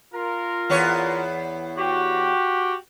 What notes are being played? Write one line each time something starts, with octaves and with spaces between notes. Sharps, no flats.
F4 A#4
E2 B3 C#5
F#4 G4